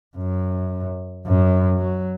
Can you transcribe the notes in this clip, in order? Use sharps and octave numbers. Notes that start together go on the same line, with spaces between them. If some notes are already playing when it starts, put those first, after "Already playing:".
F#2
F#2
F#3